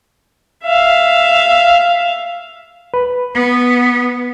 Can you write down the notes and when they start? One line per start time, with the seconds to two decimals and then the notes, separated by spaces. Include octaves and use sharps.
0.65 E5 F5
2.94 B4
3.34 B3